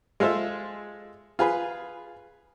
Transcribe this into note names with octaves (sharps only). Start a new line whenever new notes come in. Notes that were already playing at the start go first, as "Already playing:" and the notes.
G#3 F4 A4 C5 E5
F4 G#4 B4